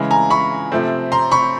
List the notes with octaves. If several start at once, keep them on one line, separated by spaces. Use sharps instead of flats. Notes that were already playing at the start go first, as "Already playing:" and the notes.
Already playing: C#3 E3 G#3
G#5 A#5
B5 C#6
C3 F3 A3 C4
A#5 C6
B5 C#6